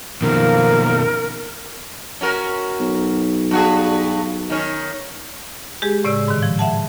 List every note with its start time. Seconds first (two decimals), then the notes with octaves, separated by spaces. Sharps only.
0.22 B2 D#3 F3 A#3 A#4
2.21 C#4 F#4 A#4
2.80 B1
3.51 G2 F#4 G#4
4.50 D#3 C#4
5.82 G#3 G4 G#4
6.05 A2 C#3 D5 E6
6.28 G#2 D#3
6.43 F3
6.59 E5 F#5 A5